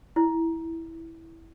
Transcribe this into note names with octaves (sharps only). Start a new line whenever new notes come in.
E4